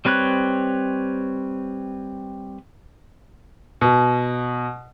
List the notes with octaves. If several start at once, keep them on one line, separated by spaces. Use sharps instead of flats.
G3 C4 B4 C#5 F#6
B2